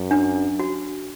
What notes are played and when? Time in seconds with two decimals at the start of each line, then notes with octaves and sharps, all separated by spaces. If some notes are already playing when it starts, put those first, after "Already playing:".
Already playing: F#2
0.11 D4
0.35 D4
0.59 F#4